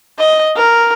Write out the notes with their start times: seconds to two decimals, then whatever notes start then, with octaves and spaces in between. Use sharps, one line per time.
0.19 D#5
0.56 A#4